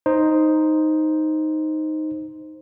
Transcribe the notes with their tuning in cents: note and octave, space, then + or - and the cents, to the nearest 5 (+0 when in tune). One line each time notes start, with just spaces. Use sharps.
D#4 +0 C5 +0